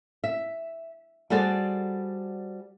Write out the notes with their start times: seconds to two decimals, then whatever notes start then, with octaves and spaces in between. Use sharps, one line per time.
0.24 E5
1.30 G3 F#4 G#4 A4 C5 D5